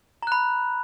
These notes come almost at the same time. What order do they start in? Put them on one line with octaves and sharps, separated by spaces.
A#5 F#6 B5